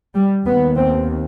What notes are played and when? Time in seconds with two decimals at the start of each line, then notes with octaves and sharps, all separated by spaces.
0.15 G3
0.46 D#2 B3
0.77 C4